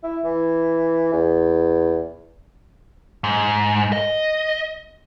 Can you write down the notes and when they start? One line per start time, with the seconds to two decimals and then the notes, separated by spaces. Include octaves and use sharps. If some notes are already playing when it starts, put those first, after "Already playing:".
0.03 E4
0.25 E3
1.13 E2
3.24 G#2
3.93 D#5